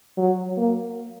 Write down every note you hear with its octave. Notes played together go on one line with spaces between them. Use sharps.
F#3
A#3